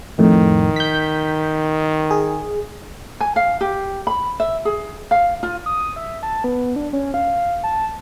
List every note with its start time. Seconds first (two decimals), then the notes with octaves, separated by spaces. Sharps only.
0.19 F2 A2 D#3
0.76 G6 B6
2.11 G#4
3.21 G#5
3.36 F5
3.61 G4
4.07 B5
4.40 E5
4.65 G#4
5.11 F5
5.43 F4
5.66 D#6
5.96 E5
6.23 A5
6.44 B3
6.76 D4
6.93 C#4
7.14 F5
7.64 A5